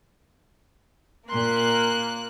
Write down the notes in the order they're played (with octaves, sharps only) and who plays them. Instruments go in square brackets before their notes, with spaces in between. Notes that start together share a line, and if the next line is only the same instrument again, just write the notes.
[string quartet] A#2 C6 [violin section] A#3 F#6